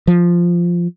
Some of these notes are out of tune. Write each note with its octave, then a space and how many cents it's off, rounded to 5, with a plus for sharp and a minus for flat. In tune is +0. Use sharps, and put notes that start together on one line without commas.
F3 -5